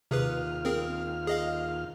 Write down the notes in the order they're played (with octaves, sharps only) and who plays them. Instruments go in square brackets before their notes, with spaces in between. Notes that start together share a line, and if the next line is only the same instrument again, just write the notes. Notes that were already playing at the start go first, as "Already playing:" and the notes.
[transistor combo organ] D#2 F4 F6 [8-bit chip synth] C3 G#4 B4
[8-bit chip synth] C4 G#4 A#4
G#4 D#5 F5